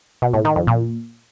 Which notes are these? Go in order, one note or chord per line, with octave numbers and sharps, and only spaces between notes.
B2
A2
D#3
F2
A#2